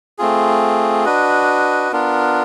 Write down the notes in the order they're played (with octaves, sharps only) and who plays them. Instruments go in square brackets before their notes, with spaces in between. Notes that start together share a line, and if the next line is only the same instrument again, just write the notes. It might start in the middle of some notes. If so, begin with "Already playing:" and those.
[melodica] A3 C4 F4 G#4
D4 F#4 B4 D#5
B3 D4 F4 A#4